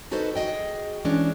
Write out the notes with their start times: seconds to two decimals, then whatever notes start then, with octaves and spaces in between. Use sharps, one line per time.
0.11 D#4 F#4 A4 B4 C5 D#5
0.35 F#4 G#4 D5 D#5 G5
1.05 E3 G#3 C#4 D4